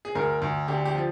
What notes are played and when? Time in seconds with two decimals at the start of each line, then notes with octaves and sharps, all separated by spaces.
0.05 G#4
0.15 D2 A#4
0.42 D2
0.68 D3 G4
0.85 G4
0.95 F3